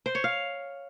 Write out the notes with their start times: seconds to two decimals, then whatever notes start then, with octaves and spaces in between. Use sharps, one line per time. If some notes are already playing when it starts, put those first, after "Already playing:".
0.06 C5
0.15 C#5
0.24 F5